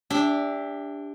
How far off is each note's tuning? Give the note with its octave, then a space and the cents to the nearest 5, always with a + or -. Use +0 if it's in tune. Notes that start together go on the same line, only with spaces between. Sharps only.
D4 -15 G4 +25 E5 +0